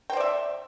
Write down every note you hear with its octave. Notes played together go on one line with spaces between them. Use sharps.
C5 D5 E5 G5